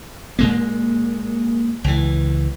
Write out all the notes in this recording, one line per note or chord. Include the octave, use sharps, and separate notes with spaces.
A#2 G#3 A#3
C#2 E3